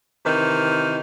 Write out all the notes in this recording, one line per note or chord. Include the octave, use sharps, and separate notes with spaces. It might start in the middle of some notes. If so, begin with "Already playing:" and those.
C3 D#3 E3